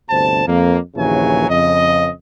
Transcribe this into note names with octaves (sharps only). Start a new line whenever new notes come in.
G1 D2 C3 C5 A5
F2 A#3
A#1 D#2 C#3 E3 F#3 G#5
F2 C#3 D#5